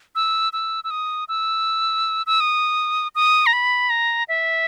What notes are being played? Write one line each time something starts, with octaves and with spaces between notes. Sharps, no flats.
E6
E6
E6
D#6
E6
E6
D#6
D#6
A#5
B5
A#5
E5